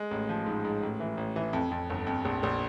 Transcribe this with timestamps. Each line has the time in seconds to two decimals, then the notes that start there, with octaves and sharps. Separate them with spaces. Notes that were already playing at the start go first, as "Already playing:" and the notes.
Already playing: G#3
0.11 A1
0.29 F3
0.46 G#2
0.65 G#2
0.83 A1
1.00 E3
1.17 A1
1.36 E3
1.53 F2
1.71 F2
1.90 G1
2.07 F2
2.25 A#1
2.43 A#1